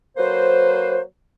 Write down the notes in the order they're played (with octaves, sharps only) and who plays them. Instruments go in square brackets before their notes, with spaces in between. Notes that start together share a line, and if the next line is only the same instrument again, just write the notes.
[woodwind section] F#3 A#3 B4 C5